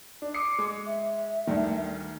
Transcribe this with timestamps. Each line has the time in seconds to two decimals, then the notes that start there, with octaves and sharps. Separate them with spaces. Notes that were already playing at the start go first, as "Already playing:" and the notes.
0.22 D4
0.34 D6 D#6 C7 C#7
0.59 G#3
0.86 E5
1.47 D2 G2 D#3